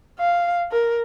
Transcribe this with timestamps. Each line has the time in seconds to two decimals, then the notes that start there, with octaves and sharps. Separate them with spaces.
0.19 F5
0.71 A#4